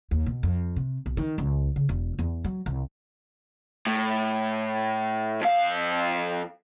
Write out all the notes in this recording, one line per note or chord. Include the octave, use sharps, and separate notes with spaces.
D#2
B2
F2
C3
B1
D#3
C#2
C#3
E1
E2
F#3
C2
A2
F2 F5